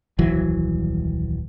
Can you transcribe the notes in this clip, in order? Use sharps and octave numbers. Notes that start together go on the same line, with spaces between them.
D#1 C2 E3 F#3